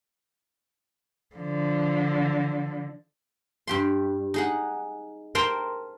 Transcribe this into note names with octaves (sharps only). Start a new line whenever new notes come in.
D3 F3
G2 G4 C6
D#4 G#4 F#5
A#4 C5 G5 A5 A#5 C6